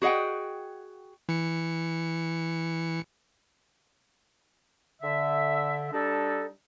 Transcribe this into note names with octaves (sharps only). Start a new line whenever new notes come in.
F#4 G#4 D#5 F#5 G5
E3 C#7
D3 E5
G3 D4 D#4 A4